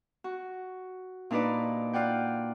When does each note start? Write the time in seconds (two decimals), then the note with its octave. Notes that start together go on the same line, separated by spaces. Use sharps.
0.24 F#4
1.31 A#2 D4 D#4 B4 D5
1.93 F4 D5 F#5 G5